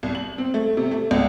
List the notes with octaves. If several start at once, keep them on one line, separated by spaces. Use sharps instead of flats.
C2
F#7
C4
A3
C3
A3
C#2